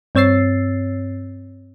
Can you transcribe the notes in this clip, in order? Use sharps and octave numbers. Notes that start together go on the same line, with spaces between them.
G2 C4 C#5 E6 A6 C7